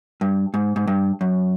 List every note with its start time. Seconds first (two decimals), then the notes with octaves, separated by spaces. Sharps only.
0.21 G2
0.54 G#2
0.76 G#2
0.87 G2
1.21 F#2